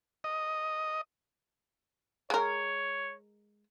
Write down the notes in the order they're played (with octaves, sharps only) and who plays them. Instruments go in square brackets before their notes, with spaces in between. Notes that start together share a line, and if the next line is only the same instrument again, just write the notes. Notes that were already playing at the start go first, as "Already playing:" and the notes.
[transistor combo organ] D#5
[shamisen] G#3 A#4 [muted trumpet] C#5